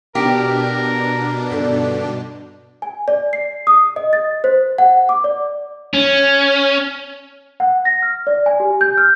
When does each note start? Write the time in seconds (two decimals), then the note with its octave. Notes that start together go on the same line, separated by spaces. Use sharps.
0.15 B2 D4 G4 A#4
1.50 G2 D3 D#3
2.82 G#5
3.08 D5
3.33 C7
3.67 D#6
3.96 D#5
4.13 A6
4.44 C5
4.78 F#5
5.09 D6
5.24 D5
5.94 C#4
7.60 F#5
7.85 A#6
8.03 F6
8.27 D5
8.46 G#5
8.60 G4
8.81 G6
8.98 F6